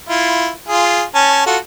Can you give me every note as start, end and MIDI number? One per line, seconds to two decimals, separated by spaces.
0.09 0.50 64
0.09 0.50 65
0.69 1.03 65
0.69 1.03 68
1.15 1.44 61
1.15 1.44 80
1.15 1.44 81
1.46 1.57 65
1.46 1.57 66
1.46 1.57 69